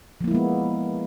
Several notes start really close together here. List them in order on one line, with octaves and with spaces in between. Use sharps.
F3 A#3 E4 G#3 B3